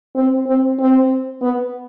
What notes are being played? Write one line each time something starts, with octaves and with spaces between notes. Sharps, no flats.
C4
C4
C4
B3